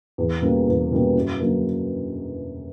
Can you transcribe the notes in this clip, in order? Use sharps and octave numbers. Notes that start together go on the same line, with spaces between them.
E2
B2 G3 A#3 C#4
E2
B2 G3 A#3 C#4
F#2
D3 F#3 A#3